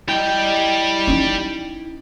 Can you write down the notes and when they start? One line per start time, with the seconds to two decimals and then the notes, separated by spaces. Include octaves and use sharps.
0.08 G3 E4 D#5 G5
1.07 C#4 D#4